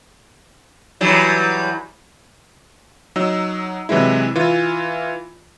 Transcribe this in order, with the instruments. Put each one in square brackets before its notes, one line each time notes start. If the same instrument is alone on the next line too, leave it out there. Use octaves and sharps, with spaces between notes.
[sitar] E3 F#3 G3
[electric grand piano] F#3 D#4 E6
C3 E3 F#3 G#3 E4
E3 F4